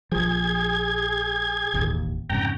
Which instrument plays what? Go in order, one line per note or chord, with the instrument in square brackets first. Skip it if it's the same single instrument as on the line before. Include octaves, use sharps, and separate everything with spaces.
[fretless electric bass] A#1 F3 [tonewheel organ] G#4 G#6
[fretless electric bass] E1 A1 D#2
[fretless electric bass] F2 G#2 C#3 [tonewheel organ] G5 A#5